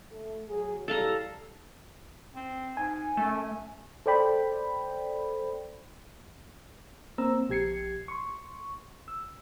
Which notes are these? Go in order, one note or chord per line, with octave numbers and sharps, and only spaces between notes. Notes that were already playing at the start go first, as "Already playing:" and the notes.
A3
F#3 G#4
A2 G3 A4 F5 A#5
C4
G#2 G#5
F#2 A3
A4 C5 D5 G5 B5
A#3 C4 C5 A#5 E6
A#1 G4 G#6 C7 C#7
C6 C#6
E6